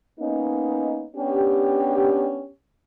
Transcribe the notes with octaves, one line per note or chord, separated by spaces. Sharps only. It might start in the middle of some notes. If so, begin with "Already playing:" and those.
A#3 B3 C#4 D#4
B3 C#4 D4 G4